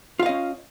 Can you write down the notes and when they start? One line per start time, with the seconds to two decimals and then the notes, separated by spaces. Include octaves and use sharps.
0.19 F4
0.23 F5
0.26 D#5
0.29 C#4